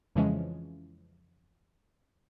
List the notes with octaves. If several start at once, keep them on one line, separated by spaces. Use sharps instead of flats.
F2 C#3 E3 F3 G#3 C#4